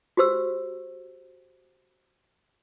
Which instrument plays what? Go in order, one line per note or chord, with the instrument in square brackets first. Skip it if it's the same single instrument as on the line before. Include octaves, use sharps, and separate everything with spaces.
[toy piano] F#4 G4 C5 E6